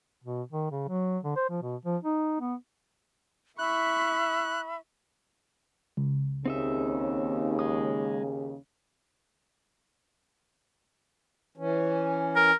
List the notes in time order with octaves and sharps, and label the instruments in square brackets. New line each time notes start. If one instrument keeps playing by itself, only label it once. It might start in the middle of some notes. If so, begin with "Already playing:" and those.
[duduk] B2
D#3
C#3
F#3
D3
C5
F3
B2
F3
D#4
B3
[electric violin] E4 C#6 [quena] E5 [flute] B5 [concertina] F#6
[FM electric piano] C#2
[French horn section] D#2 C#3 [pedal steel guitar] C4 D#4 E5
[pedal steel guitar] G#3 D#6
[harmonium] E3 C#4
[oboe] A#4